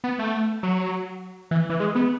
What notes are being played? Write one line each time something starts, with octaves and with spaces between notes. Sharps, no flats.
B3
A3
F#3
E3
E3
G#3
B3